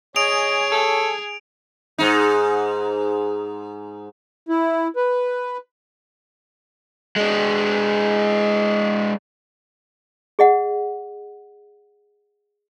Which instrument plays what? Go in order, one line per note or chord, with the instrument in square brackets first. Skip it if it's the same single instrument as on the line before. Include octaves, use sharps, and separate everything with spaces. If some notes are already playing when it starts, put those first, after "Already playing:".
[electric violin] G#4 G#5 [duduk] C#5 [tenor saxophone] D#5 [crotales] D7 F7
[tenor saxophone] A4
[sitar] G#2 D#4
[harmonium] E4
B4
[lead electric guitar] G#3 D4
[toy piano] G#4 D#5 F#5